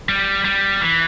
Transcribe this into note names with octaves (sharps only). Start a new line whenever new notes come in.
G3
G3
E3